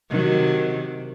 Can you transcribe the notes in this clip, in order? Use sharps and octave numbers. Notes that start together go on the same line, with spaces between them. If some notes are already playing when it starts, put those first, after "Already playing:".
C3 D#3 F#3